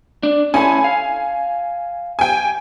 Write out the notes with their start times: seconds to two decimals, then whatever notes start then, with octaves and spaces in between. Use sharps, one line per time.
0.23 D4
0.54 C#4 E4 A4 G#5
0.84 F5
2.19 G5 G#5